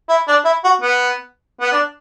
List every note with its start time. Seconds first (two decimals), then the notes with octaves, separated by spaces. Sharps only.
0.09 E4
0.28 D4
0.45 E4
0.64 F#4
0.82 B3
1.61 B3
1.72 D4